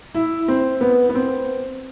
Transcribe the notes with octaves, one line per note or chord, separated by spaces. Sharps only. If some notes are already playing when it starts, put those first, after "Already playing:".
E4
C4
B3
B3
C4